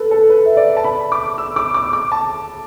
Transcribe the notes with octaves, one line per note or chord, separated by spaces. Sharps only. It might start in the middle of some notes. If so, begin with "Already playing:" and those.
Already playing: A4 B4
A4
B4
E5
D5
A5
B5
D6
E6
D6
D6
D6
A5